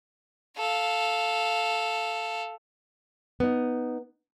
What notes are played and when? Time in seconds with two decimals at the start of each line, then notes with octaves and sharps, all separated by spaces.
0.57 A4 F5
3.40 B3 D#4